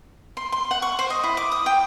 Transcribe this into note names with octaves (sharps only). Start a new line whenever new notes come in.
C6
C6
F#5
C#6
C5
D#5
E4
D6
D#6
G5